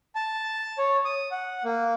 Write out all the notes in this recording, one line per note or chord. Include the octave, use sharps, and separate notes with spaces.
A5
C#5
D#6
F#5
A#3